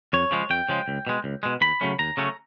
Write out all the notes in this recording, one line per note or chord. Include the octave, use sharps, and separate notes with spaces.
F2 C#5
C#3 F3 G#3
F2 G5
C#3 F3 G#3
C#2
B2 G#3
C#2
B2 G#3
D#2 B5
C#3 F#3 A3 C#4
D#2 A#5
C#3 F#3 A3 C#4